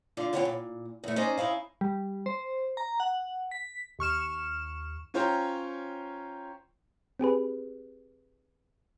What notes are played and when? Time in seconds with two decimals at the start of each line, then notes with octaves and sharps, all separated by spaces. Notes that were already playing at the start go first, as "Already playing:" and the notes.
0.17 D3 F4 D5
0.33 D3 B3 C#4 F4 C#5 G5
0.45 A#2
1.04 E2 A3
1.16 C#4 D#4 C5 D5 D#5
1.38 C#4 D#4 E4 F5
1.81 G3
2.26 C5
2.77 A#5
3.00 F#5
3.51 B6
3.99 D#2 C#6 F6 E7
5.14 C#4 F4 C5 C#5 G5 A#5
7.20 C4 G4 G#4 B4